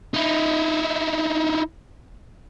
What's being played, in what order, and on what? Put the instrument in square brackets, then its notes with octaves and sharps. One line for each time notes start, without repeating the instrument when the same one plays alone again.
[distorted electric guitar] D#4 E4